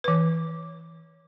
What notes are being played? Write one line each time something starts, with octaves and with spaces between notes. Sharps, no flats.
E3 B4